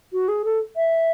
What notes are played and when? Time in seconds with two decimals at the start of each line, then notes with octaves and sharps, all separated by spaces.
0.13 F#4
0.28 G#4
0.45 A4
0.77 E5